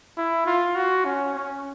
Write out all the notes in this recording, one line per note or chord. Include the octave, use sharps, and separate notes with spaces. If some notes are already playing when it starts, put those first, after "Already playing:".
E4
F4
F#4
C#4
C#4